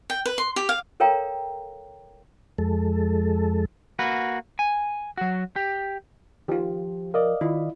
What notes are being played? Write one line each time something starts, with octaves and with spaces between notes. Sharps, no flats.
G5
B4
C6
G4
F5
A4 A#4 C#5 F5 G5 A#5
F2 G#3 A4
A#3 F#4 B4
G#5
F#3 F#4
G4
D#3 F3 F4 G4
A#4 D5 D#5 F5
D#3 E4 F4